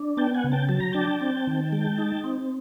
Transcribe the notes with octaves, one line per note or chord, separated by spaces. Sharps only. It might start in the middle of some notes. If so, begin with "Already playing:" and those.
Already playing: D4
B3 G5 A5
F#5 G#5
C#3
G5 A5
F#3 A5
A#5
D4 G5 A5
C4
D#3
G#3
D#4
C4